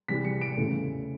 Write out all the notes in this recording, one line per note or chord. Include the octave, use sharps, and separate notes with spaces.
C3 E3 G3 B6
C#7
D7
E2 C#3 E3 A3